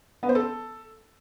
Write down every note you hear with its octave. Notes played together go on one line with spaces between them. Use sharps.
B3
C5
A4